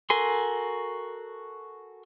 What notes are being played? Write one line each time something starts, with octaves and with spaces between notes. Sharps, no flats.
F#4 A4 A#4 G#5 C6